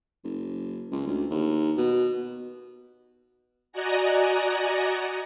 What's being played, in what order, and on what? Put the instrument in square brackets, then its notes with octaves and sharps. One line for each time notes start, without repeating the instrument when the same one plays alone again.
[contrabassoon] F#1
C#2
D2
D#2
B2
[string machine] F#4 D5 D#5 F#5 G#5 A#5